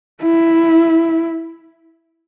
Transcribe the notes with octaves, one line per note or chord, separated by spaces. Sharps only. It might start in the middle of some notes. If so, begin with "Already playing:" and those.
E4